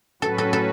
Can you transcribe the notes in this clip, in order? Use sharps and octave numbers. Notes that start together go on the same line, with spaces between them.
A2 F#3 C#4 F#4 A4 B4
A4
A4